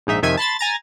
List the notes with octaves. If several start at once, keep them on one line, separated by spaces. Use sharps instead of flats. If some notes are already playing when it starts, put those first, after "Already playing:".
A#1 G#2 D#4 E5
F2 C3 D#3 E5 G#5 G#6
A5 B5 C6 A6
G#5 A#5 A6